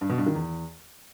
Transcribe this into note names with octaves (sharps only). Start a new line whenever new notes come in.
G2
B2
G2
D#3
E2